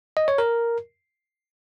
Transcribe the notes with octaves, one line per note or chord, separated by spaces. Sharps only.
D#5
C#5
A#4